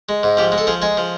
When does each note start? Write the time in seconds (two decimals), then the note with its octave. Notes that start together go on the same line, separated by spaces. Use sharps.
0.09 G#3
0.23 G#2
0.37 F3 G4
0.52 G#3
0.58 A4
0.67 F3 G#4
0.82 G#3 G#4
0.97 F3